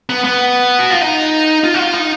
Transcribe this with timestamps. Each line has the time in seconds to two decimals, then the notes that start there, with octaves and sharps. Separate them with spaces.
0.10 B3
0.24 B3
0.79 F#4
0.90 F4
1.01 D#4
1.64 F4
1.74 F#4
1.79 F4
1.94 D#4